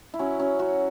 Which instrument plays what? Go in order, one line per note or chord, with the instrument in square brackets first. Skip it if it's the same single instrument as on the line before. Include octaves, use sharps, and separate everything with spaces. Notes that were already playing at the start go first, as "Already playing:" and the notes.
[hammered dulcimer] E4
F#3 C#4
F#3 C#4
F#3 F#4